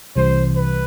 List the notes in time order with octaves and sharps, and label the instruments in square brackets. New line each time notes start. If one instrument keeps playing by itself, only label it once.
[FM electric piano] C2 C3 E3 G3 [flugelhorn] C5
[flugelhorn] B4